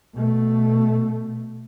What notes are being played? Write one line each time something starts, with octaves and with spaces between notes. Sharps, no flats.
B2 A3